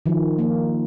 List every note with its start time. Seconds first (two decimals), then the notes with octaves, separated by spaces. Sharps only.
0.06 D#3 F3
0.39 A#3